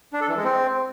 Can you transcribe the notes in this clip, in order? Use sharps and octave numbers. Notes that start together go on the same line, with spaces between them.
D4
A4
E3
G#3
C4